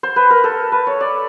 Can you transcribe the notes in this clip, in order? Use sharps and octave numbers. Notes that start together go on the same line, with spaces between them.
C5
B4
A#4
A4
B4
C#5
D5